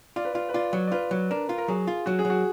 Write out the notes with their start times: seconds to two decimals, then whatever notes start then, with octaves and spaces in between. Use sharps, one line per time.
0.16 F4 D5
0.25 B4
0.34 F4 D5
0.49 B4
0.54 F4 D5
0.73 F#3
0.87 D5
0.92 F4 B4
1.11 F#3
1.30 D4 A#4
1.49 F4
1.58 A#4
1.68 F#3 G#4
1.87 F4
2.06 F#3 F#4
2.19 G#4
2.25 F#3
2.30 F#4